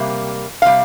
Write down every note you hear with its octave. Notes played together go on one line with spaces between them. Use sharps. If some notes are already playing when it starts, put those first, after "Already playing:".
Already playing: C3 G3 A#3
C3 G3 F5